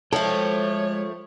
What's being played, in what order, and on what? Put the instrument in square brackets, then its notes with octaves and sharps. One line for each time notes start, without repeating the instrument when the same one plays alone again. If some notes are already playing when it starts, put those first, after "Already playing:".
[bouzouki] F3 A3 [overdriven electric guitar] G#3 G5 [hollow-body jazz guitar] A4 [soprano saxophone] C#5